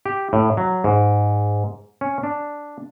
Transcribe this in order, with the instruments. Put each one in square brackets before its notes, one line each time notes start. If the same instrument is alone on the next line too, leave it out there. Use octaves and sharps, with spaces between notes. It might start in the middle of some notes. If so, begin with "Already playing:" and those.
[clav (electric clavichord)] G4
A2
F#3
G#2
C#4
D4